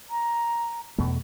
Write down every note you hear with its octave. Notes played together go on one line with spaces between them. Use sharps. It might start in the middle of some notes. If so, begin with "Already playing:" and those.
A#5
E2 B2 A3